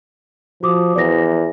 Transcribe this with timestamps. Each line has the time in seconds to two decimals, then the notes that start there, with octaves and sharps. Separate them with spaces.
0.63 F3 F#4 D6 D#6
0.95 E2 D5 A#6